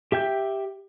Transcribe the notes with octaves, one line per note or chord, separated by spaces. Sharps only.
G4 E5 G5 G6